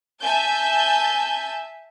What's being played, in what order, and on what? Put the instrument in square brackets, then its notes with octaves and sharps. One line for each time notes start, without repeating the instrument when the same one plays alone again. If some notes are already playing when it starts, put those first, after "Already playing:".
[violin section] E5 G#5 A5 G6